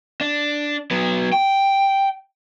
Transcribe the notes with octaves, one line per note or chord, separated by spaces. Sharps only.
D4
F#3 B3
G5